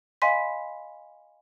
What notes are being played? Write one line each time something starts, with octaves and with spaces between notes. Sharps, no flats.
D#5 F5 G#5 B5 C6 B6